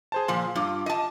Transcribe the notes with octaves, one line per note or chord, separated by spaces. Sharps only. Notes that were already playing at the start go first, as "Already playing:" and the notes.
G#4 C5 A5
A#2 F3 C6
G2 F4 D6
D#5 A5